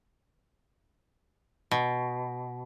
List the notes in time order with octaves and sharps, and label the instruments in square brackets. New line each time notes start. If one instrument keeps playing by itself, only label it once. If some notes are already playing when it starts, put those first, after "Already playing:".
[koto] B2